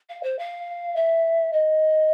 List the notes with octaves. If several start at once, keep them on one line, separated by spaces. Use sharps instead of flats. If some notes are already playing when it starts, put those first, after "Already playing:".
F5
C5
F5
E5
D#5